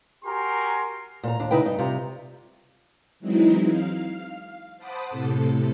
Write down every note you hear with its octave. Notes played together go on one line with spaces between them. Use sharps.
F#4 G4 A#4 G#5 A#5 C6
A#2 A#5
D#2 D4
C#3 D#4 E4 B4 G5
G2 D#4
C3 G3 F4 A#5
E3 F#3 G#3 C4 D#4 E4
F5
C5 F#5 A5 B5 D6 D#6
A2 C3 A4